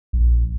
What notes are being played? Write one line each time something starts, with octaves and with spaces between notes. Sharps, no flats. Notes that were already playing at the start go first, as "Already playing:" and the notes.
A#1